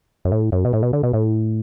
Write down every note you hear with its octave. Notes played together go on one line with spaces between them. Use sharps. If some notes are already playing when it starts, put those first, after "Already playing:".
F#2
A2
F#2
B2
A2
B2
D3
B2
A2